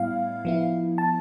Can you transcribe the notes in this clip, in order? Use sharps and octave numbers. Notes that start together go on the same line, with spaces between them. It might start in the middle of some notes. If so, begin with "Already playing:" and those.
Already playing: A2 G3 B3 E4 F5
F3 B3 E4
A5